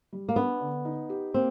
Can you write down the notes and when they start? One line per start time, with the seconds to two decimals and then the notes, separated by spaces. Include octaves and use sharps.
0.13 G3
0.29 A#3
0.36 B3 D4
0.60 D3
0.85 D#4
1.10 G4
1.34 A#3 C4